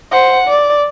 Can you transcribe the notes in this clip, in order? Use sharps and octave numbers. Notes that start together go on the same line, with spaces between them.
C5 F#5
D5